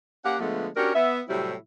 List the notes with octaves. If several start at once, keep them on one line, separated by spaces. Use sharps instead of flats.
A#3 C#4 G4 F5 F#5
D3 F3 G#3 A3 B3
C#4 D4 F#4 G4 A#4
B3 E5
A2 C3 F#3 G3 C4 E4